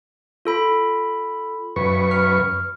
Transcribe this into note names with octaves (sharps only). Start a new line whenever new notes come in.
F4 A4 B5
F#2 B4 C#6
F6